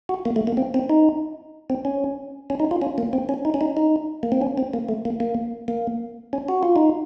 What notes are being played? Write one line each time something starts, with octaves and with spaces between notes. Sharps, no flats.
F#4
A#3
A3
A#3
C4
C4
D#4
C4
C#4
C#4
D#4
F4
C#4
A#3
C4
C#4
D#4
C#4
D#4
D#4
A#3
C4
C#4
C4
A#3
A3
A#3
A#3
A#3
C#4
F#4
F4
D#4